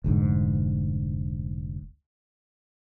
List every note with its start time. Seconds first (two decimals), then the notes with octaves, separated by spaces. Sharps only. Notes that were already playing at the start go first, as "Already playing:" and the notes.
0.04 F1 D2 G#2